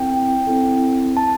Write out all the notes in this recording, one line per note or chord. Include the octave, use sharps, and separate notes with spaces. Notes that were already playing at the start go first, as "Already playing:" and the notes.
Already playing: C4 E4 A4 G5
C4 E4 A4
A5